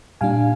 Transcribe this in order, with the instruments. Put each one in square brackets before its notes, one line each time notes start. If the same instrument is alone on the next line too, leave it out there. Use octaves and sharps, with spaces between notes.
[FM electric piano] A#2 G3 D4 F5 G#5